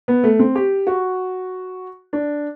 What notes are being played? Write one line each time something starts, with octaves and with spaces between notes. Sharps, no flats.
B3
A3
C4
G4
F#4
D4